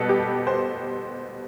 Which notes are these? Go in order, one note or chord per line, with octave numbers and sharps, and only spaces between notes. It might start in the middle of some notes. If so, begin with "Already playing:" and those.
Already playing: B2 G3 A4 B4
G4
C5